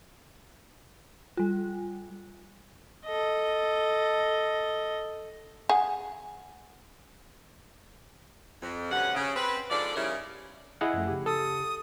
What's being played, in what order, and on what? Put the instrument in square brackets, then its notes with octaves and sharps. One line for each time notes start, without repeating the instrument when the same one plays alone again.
[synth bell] G3 F4
[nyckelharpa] A4 D#5
[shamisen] G#4 F#5
[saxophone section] F2
D2 G2 C3 C#4 F#5
C#3
C4 B4
G#2 F3 D4 A4 D5
C#3 G3 C#4 D#4 E4 A#4
[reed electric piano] E4 G#4 F#5 [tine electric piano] D#5
[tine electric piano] F#2 F3 A3
C#3 G4
[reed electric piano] A4 [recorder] D#6